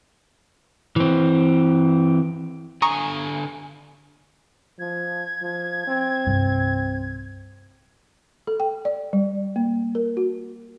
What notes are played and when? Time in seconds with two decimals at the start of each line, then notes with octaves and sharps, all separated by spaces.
0.96 E3 C4
2.82 D3 G#5 A#5 C#6 D#6
4.79 F3 G#6
5.42 F3
5.87 C4
6.27 C2 G2
8.47 A4
8.60 G5
8.85 D5
9.13 G3
9.56 A#3
9.95 A#4
10.17 F#4